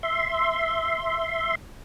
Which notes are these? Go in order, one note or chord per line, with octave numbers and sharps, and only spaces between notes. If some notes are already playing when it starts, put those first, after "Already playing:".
E5 C6